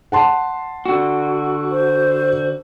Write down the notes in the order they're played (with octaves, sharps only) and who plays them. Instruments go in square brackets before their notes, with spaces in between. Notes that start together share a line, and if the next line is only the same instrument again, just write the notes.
[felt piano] F#5 A5 C6
[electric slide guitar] D3 F#4
[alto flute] C5